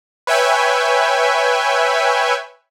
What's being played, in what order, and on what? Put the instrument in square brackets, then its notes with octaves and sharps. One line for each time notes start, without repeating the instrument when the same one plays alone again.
[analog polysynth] B4 C#5 E5 G5 G#5